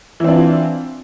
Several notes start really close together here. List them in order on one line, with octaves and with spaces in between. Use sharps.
E3 C4 D4 F4